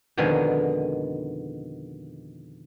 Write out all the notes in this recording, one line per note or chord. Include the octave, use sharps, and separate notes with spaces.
F2 B2 D3 D#3 G#3 G#5